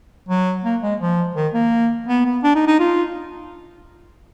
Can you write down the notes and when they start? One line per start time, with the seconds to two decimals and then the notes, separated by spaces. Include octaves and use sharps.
0.28 F#3
0.64 A#3
0.82 G#3
1.00 F3
1.35 D#3
1.54 A#3
2.08 B3
2.25 B3
2.43 D4
2.55 D#4
2.67 D#4
2.79 F4